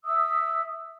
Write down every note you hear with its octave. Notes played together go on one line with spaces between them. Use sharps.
E5 D#6 E6